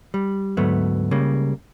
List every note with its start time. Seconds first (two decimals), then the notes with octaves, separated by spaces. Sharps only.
0.14 G3
0.57 D2 G#2 F#3 A3 B3
1.11 C#2 C#3 G3 A#3